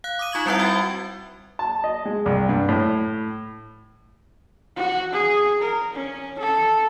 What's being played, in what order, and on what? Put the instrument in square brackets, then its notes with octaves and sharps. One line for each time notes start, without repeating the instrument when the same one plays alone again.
[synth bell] F5 F#6
D6 D#6 D#7
D#4 F4 C#6 G#6 F#7
G3 C4 E4 B4 E5 F#5
F#4 G5 G#6
[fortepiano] A5
D#5
G#3
C2
G2
A2
[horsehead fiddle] F#4
G#4
A#4
C#4
A4